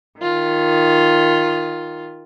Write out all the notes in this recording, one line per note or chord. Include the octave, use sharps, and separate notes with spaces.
D#3 F4